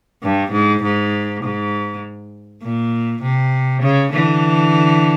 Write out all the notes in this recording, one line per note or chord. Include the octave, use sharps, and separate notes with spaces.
G2
G#2
G#2
G#2
A#2
C3
C#3
D3 E3